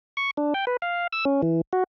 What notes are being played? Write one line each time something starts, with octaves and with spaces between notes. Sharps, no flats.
C#6
D4
G5
B4
F5
E6
C#4
E3
F#4